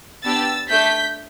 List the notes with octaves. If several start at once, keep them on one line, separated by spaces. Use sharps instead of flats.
B3 D4 G4 E6 A6
A3 D4 A4 G6 B6